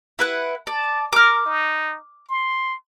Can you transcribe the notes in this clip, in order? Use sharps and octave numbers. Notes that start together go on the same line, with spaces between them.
E4 B4 F#5
D5 A5
A#4 D6 F6
D#4
C6